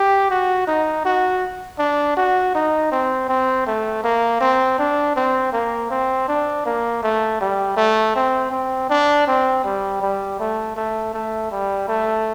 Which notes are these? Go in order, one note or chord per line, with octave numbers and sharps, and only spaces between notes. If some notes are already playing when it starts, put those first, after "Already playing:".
Already playing: G4
F#4
D#4
F#4
D4
F#4
D#4
C4
C4
A3
A#3
C4
D4
C4
A#3
C4
D4
A#3
A3
G3
A3
C4
C4
D4
C4
G3
G3
A3
A3
A3
G3
A3